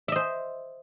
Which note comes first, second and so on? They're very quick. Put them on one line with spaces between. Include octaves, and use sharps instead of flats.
E5 D#5 C5